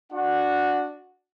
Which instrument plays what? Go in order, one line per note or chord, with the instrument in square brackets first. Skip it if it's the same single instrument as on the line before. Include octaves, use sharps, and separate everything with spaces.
[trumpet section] D4 F#4 F#5